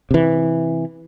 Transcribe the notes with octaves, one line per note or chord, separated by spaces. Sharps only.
C3 E3